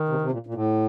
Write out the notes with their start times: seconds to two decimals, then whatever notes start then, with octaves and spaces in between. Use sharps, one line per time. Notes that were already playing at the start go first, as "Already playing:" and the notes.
Already playing: D#3
0.09 C3
0.21 C3
0.31 A#2
0.47 A#2
0.54 A2